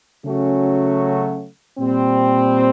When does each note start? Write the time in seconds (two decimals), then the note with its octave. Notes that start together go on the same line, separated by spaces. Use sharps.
0.24 C#3 F#3 A3 C#4 F#4
1.78 A#2 G3 C4